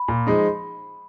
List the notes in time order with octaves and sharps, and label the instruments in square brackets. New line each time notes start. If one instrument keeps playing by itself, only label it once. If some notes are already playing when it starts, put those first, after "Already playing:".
Already playing: [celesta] B5
[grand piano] A#2
F3 G#3 D#4